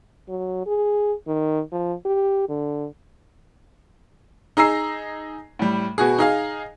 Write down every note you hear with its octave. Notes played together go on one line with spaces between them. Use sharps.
F#3
G#4
D#3
F3
G4
D3
D#4 G#4 A#5 E6 C7
A2 G3
B2 F#4 G#4
D#4 G#4 F5